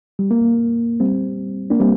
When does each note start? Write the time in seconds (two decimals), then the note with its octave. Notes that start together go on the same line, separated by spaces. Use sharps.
0.19 G3
0.31 A#3
1.00 G3 C4
1.70 A#3 D4
1.80 G3 C4